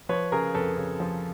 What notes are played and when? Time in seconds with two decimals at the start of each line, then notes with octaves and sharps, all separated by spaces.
0.09 F3 B4 C#5
0.32 C#3 G#4 A#4
0.54 F2 A4 B4
0.77 C#3
1.00 F3